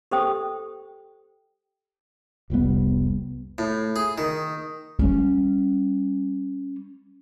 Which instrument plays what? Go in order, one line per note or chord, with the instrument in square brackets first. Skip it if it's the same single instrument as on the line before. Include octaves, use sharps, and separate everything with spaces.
[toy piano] G4 A4 C5 G5 D#6
[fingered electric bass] F1 C2 G3 B3
[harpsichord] A2
G#4
D#3
[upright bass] G3 C#4